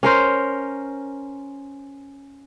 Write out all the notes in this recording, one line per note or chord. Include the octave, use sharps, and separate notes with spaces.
C#4 A#4 C5